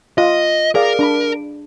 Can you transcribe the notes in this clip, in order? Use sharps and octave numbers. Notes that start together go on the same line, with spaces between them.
F4 D#5
G#4 A#4 D5 F5
D4 B5